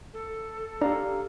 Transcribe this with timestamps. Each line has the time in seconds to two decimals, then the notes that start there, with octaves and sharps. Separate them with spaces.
0.13 A4
0.81 D4 G4 F5 A#5